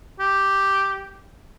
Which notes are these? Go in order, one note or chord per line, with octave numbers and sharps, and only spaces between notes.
G4